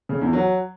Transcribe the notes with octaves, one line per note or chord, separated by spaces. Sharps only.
C#3
E2
F#3